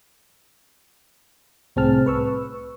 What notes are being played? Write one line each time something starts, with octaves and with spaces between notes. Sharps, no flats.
C2 A2 C4 G#4 A5 F6
B4 C#6 E6